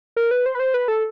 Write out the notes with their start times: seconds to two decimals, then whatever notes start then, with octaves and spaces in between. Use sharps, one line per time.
0.16 A#4
0.31 B4
0.46 C5
0.55 B4
0.59 C5
0.74 B4
0.88 A4